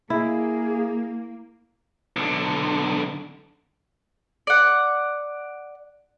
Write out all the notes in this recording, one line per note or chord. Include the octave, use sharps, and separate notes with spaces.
A#3 E4 G#4
B1 D3
D5 F#5